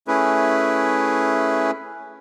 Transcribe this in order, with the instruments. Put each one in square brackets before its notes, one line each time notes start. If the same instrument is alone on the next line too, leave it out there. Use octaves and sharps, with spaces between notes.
[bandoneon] A3 C#4 E4 G#4 B4